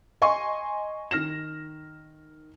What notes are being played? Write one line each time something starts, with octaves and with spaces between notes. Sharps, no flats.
D#5 G#5 C6 C#6
D#3 F6 A#6 E7